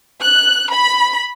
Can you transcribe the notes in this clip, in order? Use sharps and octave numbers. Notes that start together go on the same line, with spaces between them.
F#6
B5